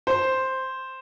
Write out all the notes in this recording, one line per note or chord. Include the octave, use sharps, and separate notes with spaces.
C5